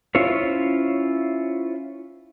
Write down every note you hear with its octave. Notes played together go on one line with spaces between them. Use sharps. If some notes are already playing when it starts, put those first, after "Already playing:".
C#4 E4 F4 C5 C#5